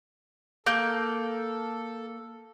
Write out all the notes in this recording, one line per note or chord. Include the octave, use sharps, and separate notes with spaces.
A#3 A4 G6